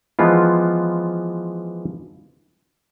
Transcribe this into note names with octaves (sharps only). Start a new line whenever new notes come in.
E3 F3 G#3 B3 F4